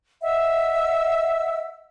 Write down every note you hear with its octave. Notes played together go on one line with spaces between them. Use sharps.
D#5 E5 F#5 E6